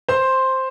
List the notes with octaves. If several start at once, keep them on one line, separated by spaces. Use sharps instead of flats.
C5 C6